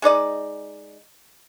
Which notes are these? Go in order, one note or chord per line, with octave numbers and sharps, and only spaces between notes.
G#3 D#4 D5 D#5